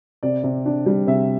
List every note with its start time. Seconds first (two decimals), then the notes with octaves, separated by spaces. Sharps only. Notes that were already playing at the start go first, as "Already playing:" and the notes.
0.23 C3 D5
0.44 C3
0.66 D4
0.86 G3
1.07 C3 E5